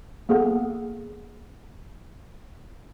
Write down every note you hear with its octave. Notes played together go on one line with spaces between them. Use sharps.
A#3 B3 G#4 A4 F#5